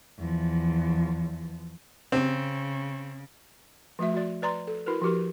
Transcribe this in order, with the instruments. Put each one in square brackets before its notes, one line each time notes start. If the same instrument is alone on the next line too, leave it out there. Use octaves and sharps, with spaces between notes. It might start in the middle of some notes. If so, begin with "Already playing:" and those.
[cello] E2 F3
[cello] C#3 [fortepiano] C4
[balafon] F3 A3 F#4 E5
F#4 D5
B4 D5 A#5 C6
A4
E4 F#4 A#4 B4
F3 F#4 G4 A#4